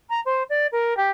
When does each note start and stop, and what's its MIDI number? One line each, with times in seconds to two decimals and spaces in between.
0.09 0.20 82
0.25 0.43 72
0.49 0.66 74
0.72 0.96 70
0.96 1.10 67